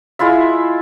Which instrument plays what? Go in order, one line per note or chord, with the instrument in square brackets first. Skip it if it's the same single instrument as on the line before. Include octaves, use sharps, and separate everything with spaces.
[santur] G#3 E4 F4 E5